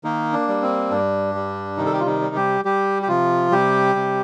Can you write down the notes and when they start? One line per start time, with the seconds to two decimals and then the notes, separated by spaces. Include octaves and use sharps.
0.04 D#3 A#3 D#4
0.33 D4
0.48 G3
0.62 C4
0.91 G2 D4
1.35 G3
1.77 C3 D#3 D#4
1.86 A4
1.93 G4
2.00 F4
2.07 D#3 D#4
2.21 G3
2.35 G3 G4
2.65 G3 G4
3.02 G4
3.08 C3 F3 F4
3.52 C3 G3 G4
3.96 C3